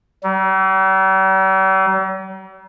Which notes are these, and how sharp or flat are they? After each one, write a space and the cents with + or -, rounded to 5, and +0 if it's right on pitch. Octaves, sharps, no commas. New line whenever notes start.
G3 -45